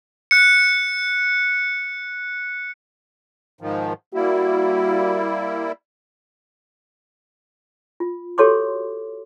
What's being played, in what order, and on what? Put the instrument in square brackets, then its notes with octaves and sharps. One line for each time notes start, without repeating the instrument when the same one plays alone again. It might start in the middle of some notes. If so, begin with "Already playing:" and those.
[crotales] F#6 C#7
[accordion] G#2 D#3 F3
[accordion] G3 A#3 E4 [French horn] F#4
[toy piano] F4
F#4 G4 A4 C#5 C6 D6